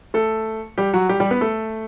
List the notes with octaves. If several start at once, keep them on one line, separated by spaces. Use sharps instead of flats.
A3 A4
G3 G4
F#3 F#4
G3 G4
G3 G4
B3 B4
A3 A4